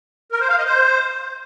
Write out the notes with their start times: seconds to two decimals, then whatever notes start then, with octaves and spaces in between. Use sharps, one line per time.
0.32 A#4
0.40 C5
0.49 F5
0.58 D#5
0.66 C5